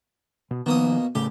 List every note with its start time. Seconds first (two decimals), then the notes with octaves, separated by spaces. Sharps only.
0.51 B2
0.66 B2 D#3 F3 A#3 D#6
1.15 A2 C#3 A3 G4